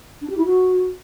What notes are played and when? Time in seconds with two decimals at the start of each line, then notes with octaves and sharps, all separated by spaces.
0.22 D4
0.30 G4
0.37 E4
0.45 F#4